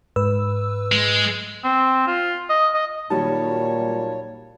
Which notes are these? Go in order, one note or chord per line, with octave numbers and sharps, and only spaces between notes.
G#2 B4 E6
G#3
C4
F4
D#5
D#5
A#2 D#3 F#3 G3 C#5 A5